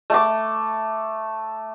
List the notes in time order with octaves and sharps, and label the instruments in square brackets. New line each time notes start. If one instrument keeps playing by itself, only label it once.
[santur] A3 D6